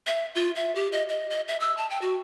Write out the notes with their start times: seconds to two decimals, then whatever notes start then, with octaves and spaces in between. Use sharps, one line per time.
0.07 E5
0.35 F4
0.55 E5
0.75 G4
0.92 D#5
1.09 D#5
1.30 D#5
1.48 E5
1.60 E6
1.77 A5
1.90 G5
2.01 F#4